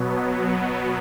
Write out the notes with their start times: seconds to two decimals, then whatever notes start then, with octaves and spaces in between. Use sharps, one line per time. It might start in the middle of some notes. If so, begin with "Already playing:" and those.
Already playing: B2 F#3 B3